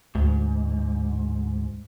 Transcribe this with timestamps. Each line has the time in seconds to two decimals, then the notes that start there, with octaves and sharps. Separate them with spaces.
0.15 D2 G#2